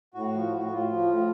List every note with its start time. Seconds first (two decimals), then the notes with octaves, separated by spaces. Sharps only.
0.14 A2 F#4
0.34 F3
0.52 A2
0.71 A2 F4
0.90 F3
1.08 A2